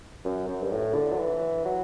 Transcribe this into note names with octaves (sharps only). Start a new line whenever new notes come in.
F#2
F#2
G2
A2
D3
F#3
E3
F#3